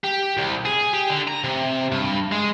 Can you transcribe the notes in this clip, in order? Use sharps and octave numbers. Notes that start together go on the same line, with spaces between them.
G4
C2
G#4
G4
D3
A#5
C3
G2
G#3